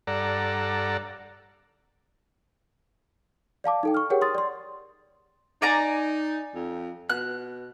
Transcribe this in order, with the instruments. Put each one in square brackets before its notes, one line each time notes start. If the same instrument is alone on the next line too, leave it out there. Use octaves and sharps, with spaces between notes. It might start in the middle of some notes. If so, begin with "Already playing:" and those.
[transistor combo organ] G2 A4 D5 F#5 A#5
[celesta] D5 F5 A5 D6
D#4 A4 G5
C#6 F6
G4 G#4 A#4 C#5 F#5 G5
C6 D#6 A6
D5 C6
[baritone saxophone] D#4 [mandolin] D5 G#5 A#5
[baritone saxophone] F2
[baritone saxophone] B2 [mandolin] F#6